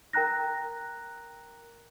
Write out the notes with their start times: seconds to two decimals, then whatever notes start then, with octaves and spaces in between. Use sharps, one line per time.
0.13 A#4 G5 A#5 F#6 A#6